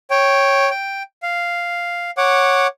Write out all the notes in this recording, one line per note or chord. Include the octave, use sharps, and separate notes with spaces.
C#5 G5
G5
F5
C#5 F#5 D6